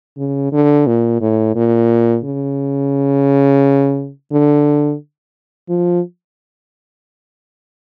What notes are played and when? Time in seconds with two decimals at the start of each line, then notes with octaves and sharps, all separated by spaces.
0.18 C#3
0.53 D3
0.87 A#2
1.21 A2
1.55 A#2
2.24 C#3
4.32 D3
5.69 F3